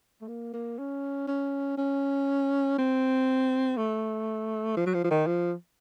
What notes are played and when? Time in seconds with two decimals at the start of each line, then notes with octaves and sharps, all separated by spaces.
0.21 A3
0.28 A#3
0.53 A#3
0.79 C#4
1.28 C#4
1.78 C#4
2.78 C4
3.77 A3
4.77 F3
4.86 F#3
4.94 F3
5.04 F3
5.11 D#3
5.27 F3